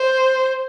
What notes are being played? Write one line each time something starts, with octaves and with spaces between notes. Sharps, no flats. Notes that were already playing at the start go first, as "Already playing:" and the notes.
Already playing: C5